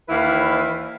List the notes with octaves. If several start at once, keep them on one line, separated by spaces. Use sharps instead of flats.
D#2 E3 E4 B4 F5